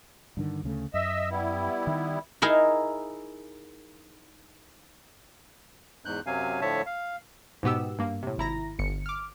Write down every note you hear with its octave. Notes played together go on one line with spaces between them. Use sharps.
G2 D3 D#3
D2 C#3 A3
F#2 D#5 E5 E6
G3 B3 E4
D#3
D#4 E4 G#4 A#4
E2 G#2 F#6 G6
F#2 C3 F#3 F5 G#5
A2 D3 F3 C#5 E5 A5
F5
G#2 B2 B3 G4 E6
G2 A#3
A2 C3
G#1 E4 A#5 A#6
G1 C#7
D6 F6